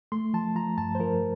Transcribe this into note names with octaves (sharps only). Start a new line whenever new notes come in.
A3 C6
F3 A5
F3 A#5
G2 A5
C5
F3 A#4